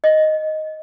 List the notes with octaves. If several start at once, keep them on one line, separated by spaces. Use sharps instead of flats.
D#5